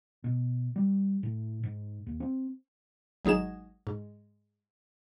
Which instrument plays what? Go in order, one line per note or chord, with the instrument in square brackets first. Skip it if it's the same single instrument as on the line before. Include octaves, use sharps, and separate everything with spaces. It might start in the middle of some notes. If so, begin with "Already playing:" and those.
[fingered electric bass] B2
G3
A2
G#2
D#2
C4
[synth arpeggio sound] G#1 F#3 D#4 G#4 E7
G#2